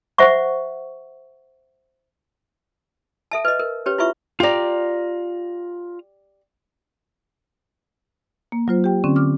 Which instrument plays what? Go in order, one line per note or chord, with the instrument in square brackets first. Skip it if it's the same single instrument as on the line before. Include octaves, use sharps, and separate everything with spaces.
[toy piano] C5 E5 F#5 C#6
A4 E5 A5
B4 D#5
A#4
C#4 G4 B4 C#5
E4 F4 B4 E5 C#6
[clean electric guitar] F4 A#5 [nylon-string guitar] G4 D5
[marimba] A#3
F#3 F4 C5
G4 G5
D3 C4 C#4
D6 F6